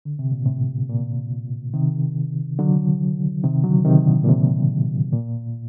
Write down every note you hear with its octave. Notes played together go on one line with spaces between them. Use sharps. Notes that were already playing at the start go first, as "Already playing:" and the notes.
D3
C3
A#2
A2 C3
A#2
C3 D#3
D3 F#3
C3 D#3
D3 F#3
C3 D#3
A#2 D3
A#2
A2 C3
A#2